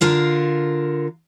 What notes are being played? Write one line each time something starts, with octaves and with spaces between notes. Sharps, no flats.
D3 F4 A#4 F5